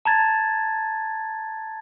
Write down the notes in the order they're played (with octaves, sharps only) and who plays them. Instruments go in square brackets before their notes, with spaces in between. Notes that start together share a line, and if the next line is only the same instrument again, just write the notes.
[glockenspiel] A5 A#5 G#6 A6